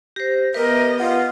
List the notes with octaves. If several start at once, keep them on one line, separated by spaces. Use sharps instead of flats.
G4 C5 A#6
B3 G4 A#4 B4 D#5 E5
F4 F#5